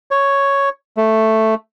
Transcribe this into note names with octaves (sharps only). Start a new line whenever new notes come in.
C#5
A3